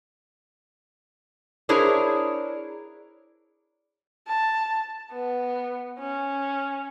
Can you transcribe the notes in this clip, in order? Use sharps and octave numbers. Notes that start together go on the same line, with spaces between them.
D4 E4 G#4 A#4 C5 C#5
A5
B3
C#4